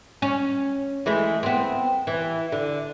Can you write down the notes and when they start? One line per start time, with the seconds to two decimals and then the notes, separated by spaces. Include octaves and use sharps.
0.22 C#4
1.06 E3 G#3 A3
1.43 B3 C4
2.07 E3
2.52 D3